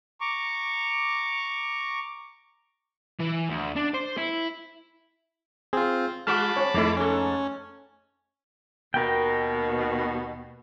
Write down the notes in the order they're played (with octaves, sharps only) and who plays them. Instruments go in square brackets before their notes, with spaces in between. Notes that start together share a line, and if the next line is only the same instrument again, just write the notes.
[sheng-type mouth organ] A#5 C#6 D6
[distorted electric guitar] E3
D2
D4
C5
E4
[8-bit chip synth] C4 F4 [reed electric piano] G#4
[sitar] G3 F4 [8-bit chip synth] A5 B5 D6 [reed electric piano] F6
[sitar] C4 [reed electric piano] C#5
[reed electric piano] F2 A3 [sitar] G#3 D#4 E4
[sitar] G#2 A4 [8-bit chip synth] C#4
[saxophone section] D#2 B2 [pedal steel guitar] A#4 G5